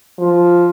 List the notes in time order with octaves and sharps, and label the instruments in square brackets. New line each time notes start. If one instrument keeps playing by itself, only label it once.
[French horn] F3